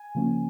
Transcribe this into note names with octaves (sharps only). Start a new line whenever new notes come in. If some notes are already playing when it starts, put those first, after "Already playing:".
Already playing: G#5
C#3 F3 A#3 C#4